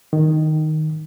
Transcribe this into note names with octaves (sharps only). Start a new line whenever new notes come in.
D#3